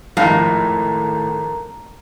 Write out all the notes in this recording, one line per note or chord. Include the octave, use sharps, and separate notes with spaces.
G#1 A2 F3 A#4 F5 A#5